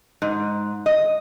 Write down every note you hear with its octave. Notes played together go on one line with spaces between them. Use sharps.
G#2
D#5